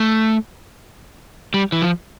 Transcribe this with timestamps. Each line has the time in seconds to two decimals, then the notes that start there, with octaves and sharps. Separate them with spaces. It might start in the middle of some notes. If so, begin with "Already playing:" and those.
Already playing: A3
1.54 G3
1.72 E3
1.82 F3